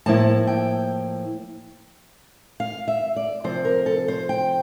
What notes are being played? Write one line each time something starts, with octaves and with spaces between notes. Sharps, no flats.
A2 F3 A#3 E4 A5
G5
F5
E5
D5
C3 F3 C4 C5
A#4
A4
C5
G5